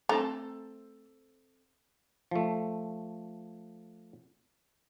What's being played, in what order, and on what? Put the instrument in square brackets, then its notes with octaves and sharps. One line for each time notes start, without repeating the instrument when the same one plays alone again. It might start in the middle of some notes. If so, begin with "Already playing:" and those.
[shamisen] A3 [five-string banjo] C4 A4 A#5
[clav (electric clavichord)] F3 A3